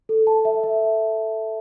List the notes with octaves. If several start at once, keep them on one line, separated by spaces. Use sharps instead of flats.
A4
A5
E5
E5